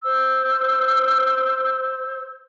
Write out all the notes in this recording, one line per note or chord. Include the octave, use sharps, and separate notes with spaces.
C5 E6